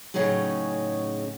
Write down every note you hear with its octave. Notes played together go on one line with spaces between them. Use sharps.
A2 C#3 F#3 C#4 D#4 G#4